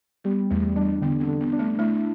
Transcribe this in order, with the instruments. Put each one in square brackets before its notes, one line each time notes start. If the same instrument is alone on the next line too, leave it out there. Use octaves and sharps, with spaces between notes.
[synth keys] G3 [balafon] B3
[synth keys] E2 [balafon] A3
[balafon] G3 [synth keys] D4
[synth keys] D3 [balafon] B3
[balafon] C4
[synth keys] D3
[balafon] B3
[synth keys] D4
[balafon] A3
[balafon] A3 [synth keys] E4